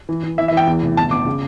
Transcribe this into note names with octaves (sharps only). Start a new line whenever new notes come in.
E3
E3
E3 E5
E5
E3 G5
E2
F1
G1 A5
G1 D6
C#3